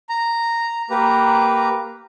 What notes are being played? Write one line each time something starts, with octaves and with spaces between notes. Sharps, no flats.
A#5
A#3 G4 B4 A#5